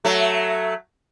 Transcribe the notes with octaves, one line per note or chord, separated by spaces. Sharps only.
F#3 A3